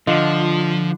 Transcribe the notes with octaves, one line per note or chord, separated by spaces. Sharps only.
D3 F3 F4 D#5